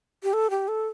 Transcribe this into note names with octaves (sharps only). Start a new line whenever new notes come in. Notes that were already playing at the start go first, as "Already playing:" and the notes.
G4
A4
G4
A4